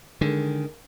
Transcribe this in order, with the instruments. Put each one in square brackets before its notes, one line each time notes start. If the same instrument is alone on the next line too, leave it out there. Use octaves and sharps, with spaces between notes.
[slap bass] D3 [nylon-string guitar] D#3 G#3